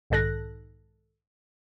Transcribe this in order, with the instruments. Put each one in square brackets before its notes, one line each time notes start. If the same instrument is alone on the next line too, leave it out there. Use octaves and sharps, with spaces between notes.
[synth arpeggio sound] B1 G#2 D#3 A4 F#6 A#6